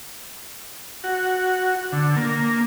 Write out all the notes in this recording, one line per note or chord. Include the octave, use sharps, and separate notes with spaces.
F#4
D3
A#3